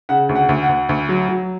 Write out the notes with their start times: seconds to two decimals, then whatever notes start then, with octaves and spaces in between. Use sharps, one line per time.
0.09 C#3 F#5
0.29 D2
0.36 F#5
0.49 D2
0.62 F#5
0.69 D2
0.89 D2
1.09 F#3
1.29 F#3